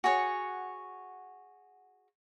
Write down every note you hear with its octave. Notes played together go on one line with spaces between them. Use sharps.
F#4 G#4 C#5 F#5